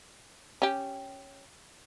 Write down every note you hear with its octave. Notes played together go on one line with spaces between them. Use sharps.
C#4 G4